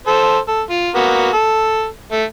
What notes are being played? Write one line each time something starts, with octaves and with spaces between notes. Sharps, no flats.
A4 C5
A4
F4
A#3 B3 F#4
A4
A3